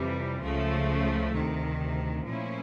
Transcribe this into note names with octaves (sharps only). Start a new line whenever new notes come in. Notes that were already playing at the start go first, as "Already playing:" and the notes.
Already playing: F2 C3 E3 G3
C#2 C#3 F3 A3
D2 C3 D#3
A#2 F3 A3 C#4 E4